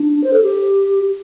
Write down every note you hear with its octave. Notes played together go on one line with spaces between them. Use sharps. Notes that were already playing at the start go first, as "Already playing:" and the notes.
Already playing: D4
C5
A4
G4